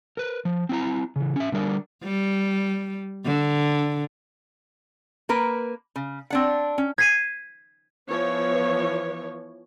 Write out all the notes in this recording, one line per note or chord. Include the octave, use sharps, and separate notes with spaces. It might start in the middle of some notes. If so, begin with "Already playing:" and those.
A#4 B4
F3
C4 E4 A#5
C#3 E3
C#4 E5
D3 G3 A#4 D5
G3
D3
A#3 A#4 B4
C#3
C4 D4 F#5
C#4
G#6 B6 C7 D#7
E3 F3 B3 C#5